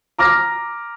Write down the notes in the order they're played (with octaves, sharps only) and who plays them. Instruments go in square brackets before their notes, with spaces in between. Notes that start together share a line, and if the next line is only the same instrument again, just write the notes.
[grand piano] A#5 D6 F6 A#6